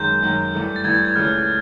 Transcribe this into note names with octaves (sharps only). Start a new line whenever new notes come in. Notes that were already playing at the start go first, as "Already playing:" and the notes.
Already playing: F#2 D#3 G#3 G6
F#2 D#3 G#3
G2 E3 A3
A6
G2 E3 A3 G#6
A6
G#6
C#2 C#3 E3 A3 F6